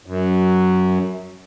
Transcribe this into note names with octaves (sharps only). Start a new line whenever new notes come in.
F#2